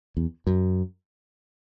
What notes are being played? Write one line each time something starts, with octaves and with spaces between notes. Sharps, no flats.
E2
F#2